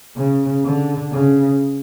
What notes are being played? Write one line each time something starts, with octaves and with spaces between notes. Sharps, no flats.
C#3
D3
C#3